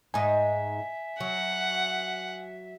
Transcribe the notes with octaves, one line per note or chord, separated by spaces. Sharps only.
G#2 D#4 E5 G#5
F#3 F#5